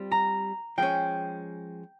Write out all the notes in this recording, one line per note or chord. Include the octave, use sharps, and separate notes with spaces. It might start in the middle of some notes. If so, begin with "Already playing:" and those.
Already playing: G3 C4 F4
A#5
F3 G#3 C#4 G5